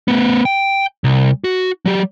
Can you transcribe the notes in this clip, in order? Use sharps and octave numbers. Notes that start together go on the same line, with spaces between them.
A3 B3
G5
C2
F#4
F#3 G4